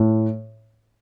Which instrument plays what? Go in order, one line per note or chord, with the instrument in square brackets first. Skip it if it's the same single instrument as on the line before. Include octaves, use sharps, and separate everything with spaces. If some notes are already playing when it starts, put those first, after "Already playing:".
Already playing: [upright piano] A2